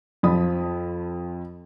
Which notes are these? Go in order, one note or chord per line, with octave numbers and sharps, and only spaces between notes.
F2 F3 B5 D#6